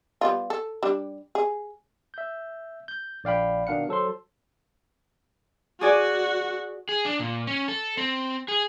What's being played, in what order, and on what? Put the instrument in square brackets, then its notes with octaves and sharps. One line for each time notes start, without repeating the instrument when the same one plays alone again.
[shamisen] G3 B3 F4
A4
G3 D4
G#4
[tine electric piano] E5 G6
G6
A#1 D5 F5 G5 B5
B2 D#3 D4 F5 F#5 C#7
F#3 A4 C5 C6
[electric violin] F#4 [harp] G#4 D5 G#5
[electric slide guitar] G#4
D4
A#2
C#4
A4
C4
G#4